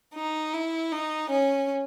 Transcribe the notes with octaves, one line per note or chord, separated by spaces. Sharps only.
D#4
E4
D#4
C#4